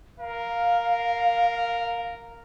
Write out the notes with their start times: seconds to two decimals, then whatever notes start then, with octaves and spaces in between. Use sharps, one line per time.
0.19 A#4 F5